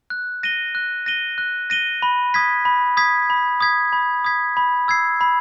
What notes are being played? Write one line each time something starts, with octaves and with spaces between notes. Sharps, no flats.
F#6
A#6 D#7 G7
F#6
A#6 D#7 G7
F#6
A#6 D#7 G7
B5
D#6 G#6 B6
B5
D#6 G#6 B6
B5
D#6 G#6 B6
B5
D#6 G#6 B6
B5
E6 G#6 C7
B5